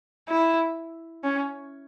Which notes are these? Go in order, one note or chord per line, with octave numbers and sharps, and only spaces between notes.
E4
C#4